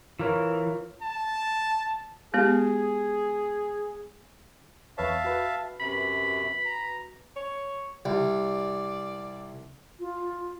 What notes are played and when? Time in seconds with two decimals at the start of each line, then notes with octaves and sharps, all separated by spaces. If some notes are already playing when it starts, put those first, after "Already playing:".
0.19 E3 F4 A#4 C#5
1.02 A5
2.34 G#3 B3 G4 G#4
4.98 E2 B4 C#5 E5 F5 A5
5.24 F#4 B4
5.80 F#2 C3 B5
6.66 A#5
7.36 C#5
8.05 C2 D5
10.00 F4